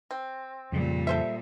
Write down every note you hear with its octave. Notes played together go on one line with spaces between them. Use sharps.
C4
F2 A#2 C#3 G3
A4 C5 E5